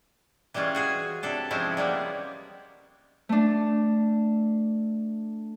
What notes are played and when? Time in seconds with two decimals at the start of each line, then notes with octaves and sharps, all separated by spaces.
0.54 E3 G3 G#3 C#4 F4
0.75 F#4 G#4 G#5
1.23 C3 D4 A4
1.51 F3 G#3 C4 C#4 E4
1.77 G3 A#3 B3
3.29 A3 D4